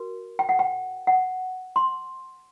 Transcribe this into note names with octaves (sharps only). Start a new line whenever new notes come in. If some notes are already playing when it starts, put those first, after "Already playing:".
Already playing: F#4 A#4
G5
F#5
G5
F#5
C6